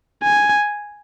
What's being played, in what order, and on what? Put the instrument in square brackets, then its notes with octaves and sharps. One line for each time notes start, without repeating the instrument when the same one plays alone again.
[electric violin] G#5